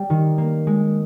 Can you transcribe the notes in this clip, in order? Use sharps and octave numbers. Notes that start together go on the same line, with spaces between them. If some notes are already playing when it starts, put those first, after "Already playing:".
Already playing: G3
D#3
A#3
G#3